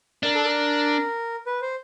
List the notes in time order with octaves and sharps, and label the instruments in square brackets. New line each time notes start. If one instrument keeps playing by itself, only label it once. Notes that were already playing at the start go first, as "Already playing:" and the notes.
[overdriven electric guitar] D4 [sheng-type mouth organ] A#4
[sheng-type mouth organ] A4
A#4
B4
C5